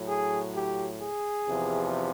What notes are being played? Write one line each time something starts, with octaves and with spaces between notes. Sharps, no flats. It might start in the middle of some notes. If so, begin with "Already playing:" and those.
Already playing: A2 F#3
G#4
G4
G#4
E2 C3 F3